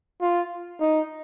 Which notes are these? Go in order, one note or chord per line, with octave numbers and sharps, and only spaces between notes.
F4
D#4